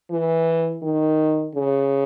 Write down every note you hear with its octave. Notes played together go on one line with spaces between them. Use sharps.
E3
D#3
C#3